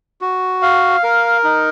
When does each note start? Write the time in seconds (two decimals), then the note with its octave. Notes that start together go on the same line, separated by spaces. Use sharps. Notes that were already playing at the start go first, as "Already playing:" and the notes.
0.21 F#4
0.62 F5
1.03 A#4
1.44 D#4